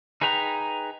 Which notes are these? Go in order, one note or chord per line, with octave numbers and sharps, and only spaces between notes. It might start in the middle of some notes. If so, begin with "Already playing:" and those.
D#4 G#4 B4 G5 A#5